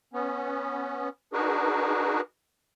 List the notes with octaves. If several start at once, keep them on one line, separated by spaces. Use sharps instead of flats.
B3 C#4
D4 D#4 F#4 G#4 A#4 B4